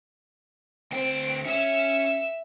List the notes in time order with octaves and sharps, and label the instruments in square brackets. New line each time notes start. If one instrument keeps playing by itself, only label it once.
[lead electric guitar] D2 G5 [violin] C4 D7
[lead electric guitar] C#4 C#5 [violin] E5 E6